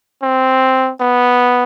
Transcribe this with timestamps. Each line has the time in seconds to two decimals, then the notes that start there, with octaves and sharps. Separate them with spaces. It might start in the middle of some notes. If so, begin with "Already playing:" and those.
0.22 C4
1.00 B3